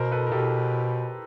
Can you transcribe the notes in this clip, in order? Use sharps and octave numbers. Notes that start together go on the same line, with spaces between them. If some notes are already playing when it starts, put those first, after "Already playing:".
Already playing: B2 A#4 C5
A4 B4
A#4
B2 G4 A4